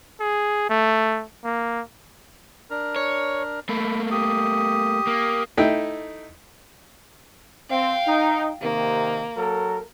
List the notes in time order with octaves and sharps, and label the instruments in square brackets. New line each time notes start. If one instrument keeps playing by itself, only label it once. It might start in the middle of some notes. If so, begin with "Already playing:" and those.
[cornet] G#4
A3
A#3
[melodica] D4 A#4
[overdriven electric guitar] C#5
[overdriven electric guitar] A3 A#3 [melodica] B5
[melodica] G4 D#6
[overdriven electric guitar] A#3
[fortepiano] A3 D#4 E4 G5
[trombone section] C4 [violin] F5 G5
[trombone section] D#4
[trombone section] C3 D#3 [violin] A#3
[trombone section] F#3 A4 A#4